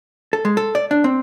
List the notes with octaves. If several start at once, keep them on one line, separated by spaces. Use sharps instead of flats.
A4
G#3
A4
D5
D4
C4